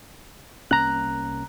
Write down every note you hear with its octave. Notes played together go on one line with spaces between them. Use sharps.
C2 A#3 C#4 A#5 F#6